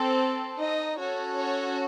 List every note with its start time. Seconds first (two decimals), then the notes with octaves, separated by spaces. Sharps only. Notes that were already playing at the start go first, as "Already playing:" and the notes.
Already playing: C4 A4
0.58 D#4 D#5
0.98 C#4 F#4 A4 C#5
1.37 C#5